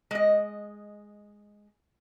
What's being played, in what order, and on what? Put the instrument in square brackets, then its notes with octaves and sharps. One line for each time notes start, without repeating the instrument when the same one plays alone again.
[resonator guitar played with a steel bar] G#3 D#5